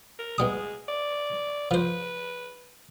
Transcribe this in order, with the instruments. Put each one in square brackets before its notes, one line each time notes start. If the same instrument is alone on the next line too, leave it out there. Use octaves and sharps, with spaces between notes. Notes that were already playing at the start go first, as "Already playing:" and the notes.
[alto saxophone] A#4
[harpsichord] B2 G3 D#6 [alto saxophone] G#3
[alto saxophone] D5
[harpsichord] F3 C5 [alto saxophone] B4